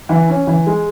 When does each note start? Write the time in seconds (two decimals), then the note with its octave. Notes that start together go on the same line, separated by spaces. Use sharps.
0.09 E3
0.28 C#4
0.47 E3
0.66 G#3